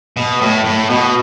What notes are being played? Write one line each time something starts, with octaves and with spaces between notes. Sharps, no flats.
B2
A2
A2
B2